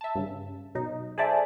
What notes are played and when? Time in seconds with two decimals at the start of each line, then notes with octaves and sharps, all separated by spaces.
0.01 E5 A5
0.15 G2 C#3
0.75 B2 F#3 D#4
1.18 G#4 A4 C5 D5 E5 A5